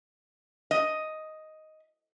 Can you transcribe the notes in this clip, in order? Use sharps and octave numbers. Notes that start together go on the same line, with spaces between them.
D#5